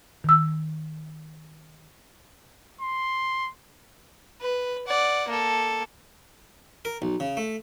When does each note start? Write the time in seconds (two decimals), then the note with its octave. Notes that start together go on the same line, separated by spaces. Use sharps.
0.24 D#3 E6
2.81 C6
4.42 B4
4.87 D5 F#5
5.28 A#3 A4
6.85 A#4
7.02 B1
7.20 C#3
7.37 A3